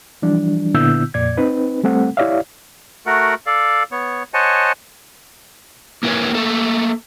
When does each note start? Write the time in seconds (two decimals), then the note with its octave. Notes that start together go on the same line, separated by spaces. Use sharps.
0.22 E3 F3 G3 D4
0.74 A#2 D3 B3 E4 E6 G6
1.14 F2 A#2 D5 G#6
1.37 C4 D#4 B4
1.84 G3 A3 C4 A4 F#5
2.17 E4 G4 C#5 D5 E5 F5
3.06 A3 F#4 A#4 F#5
3.47 A4 D5 F5
3.92 B3 C#5
4.34 C5 C#5 D#5 F#5 G#5 A5
6.03 A#3 E4 A#4 B4 C#5
6.35 A3 A#3 A4